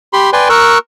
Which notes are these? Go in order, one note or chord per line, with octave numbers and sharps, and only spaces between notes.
G4 B5 C6
B4 D5 G5 G#5 C6
A#4 C#6 E6 F#6